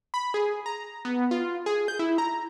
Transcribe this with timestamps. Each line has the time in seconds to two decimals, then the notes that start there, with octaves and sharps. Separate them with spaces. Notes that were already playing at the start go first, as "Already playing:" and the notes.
0.14 B5
0.34 G#4
0.66 A#5
1.05 B3
1.31 F4
1.66 G#4
1.88 G6
1.99 E4
2.18 A#5